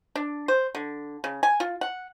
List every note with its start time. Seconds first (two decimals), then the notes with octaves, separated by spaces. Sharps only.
0.16 D4
0.48 C5
0.75 D3
1.24 C#3
1.43 G#5
1.60 F4
1.81 F#5